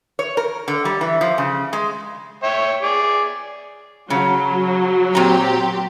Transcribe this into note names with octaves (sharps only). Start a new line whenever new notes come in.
C#5
A#4
D3
G3
E3
F3
C#3
G#3
C#5 E5 G5
G#4 D5
C#3 F#3
A#2 C4 G4 A#5